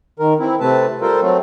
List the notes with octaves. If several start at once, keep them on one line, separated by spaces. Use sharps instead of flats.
D#3 A#4
E3 C4 E4
C3 A3 C4 B4 A5
G3 F4 A4 A#4 C5
F#3 A3 C4